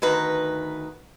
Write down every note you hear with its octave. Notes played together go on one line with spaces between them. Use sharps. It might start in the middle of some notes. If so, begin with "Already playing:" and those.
D2 D#3 B4 A#5